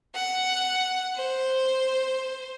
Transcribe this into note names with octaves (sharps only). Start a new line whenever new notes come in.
F#5
C5